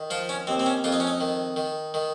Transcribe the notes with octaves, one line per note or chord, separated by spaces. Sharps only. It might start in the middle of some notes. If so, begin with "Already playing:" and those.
Already playing: D#3
F3 F4
C#4
D#2 C4
C4
C#4
F2 F4
D#4
C#4
D#4
D#3
D#3
D#3